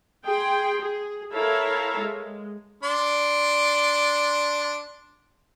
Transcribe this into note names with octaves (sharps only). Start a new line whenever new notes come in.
G#4 G5 C6
G#4
E4 A4 A#4 C#5 E5 F5
G#3
D4 D5 C6